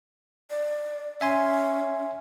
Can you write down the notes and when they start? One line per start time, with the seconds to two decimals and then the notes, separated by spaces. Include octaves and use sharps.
0.50 D5
1.21 C#4 E5 G#5 C6